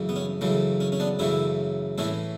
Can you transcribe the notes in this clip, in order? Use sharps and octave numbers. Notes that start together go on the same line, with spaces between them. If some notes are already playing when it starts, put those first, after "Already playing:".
Already playing: F#2 C#3 E3 A3
B3
C#4
F#2 C#3 E3 A3
C#4
C#4
B3 D4
F#2 C#3 E3 A3 C#4 E4
A2 E3 A3 C#4 E4